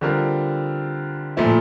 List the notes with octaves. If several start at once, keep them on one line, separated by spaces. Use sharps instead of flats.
D3 G3 C4 F4 A#4
A#2 F3 A3 E4